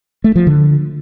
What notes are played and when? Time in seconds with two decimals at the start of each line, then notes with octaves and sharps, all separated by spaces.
0.24 A3
0.36 F3
0.47 D3